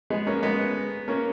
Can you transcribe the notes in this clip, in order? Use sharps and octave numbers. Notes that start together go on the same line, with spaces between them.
G#3 B3
A#3 C#4
G#3 B3
A#3 C#4